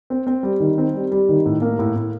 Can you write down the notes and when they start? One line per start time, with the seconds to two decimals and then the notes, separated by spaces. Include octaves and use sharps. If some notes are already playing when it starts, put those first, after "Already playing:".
0.10 C4
0.27 C4
0.43 G3
0.60 D#3
0.78 C4
0.94 G3
1.12 G3
1.29 D#3
1.46 A2
1.62 A#3
1.79 A2
1.96 A2